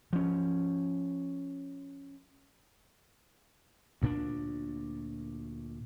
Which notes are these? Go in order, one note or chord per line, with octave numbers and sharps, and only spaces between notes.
F3 C#4
D2 A#2 C#4 D4